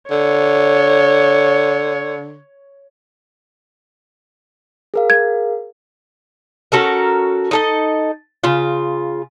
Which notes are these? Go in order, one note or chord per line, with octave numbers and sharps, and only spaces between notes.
D3 C#5
G#4 A#4 F5
G#6
C#4 F#4 A4 A#4
D#4 A4 D#5
C#3 F4